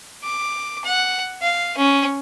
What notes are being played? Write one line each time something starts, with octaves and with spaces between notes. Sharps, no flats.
D6
F#5
F5
C#4